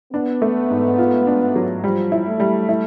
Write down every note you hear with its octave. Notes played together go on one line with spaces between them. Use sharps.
B3 D4
A3
G#2
F4
D4
F#3
F3 G3
E4
A3
G3
E4